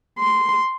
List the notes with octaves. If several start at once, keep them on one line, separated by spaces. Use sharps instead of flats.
C6